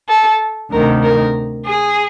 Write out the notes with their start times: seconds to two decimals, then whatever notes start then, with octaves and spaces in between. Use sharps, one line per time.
0.09 A4
0.71 D2 C3 D#3 A#4
1.02 A#4
1.65 G#4